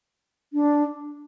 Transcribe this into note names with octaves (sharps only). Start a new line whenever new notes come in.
D4